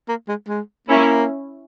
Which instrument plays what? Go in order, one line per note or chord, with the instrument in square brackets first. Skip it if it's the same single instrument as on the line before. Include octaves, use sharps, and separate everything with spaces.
[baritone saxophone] A#3
G#3
G#3
[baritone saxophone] A#3 [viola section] C#4 E4